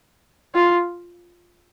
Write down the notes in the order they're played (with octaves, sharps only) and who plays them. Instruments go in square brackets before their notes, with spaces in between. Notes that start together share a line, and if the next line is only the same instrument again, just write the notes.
[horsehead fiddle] F4